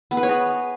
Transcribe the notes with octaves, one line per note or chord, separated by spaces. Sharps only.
B3
B4
C#5
G#4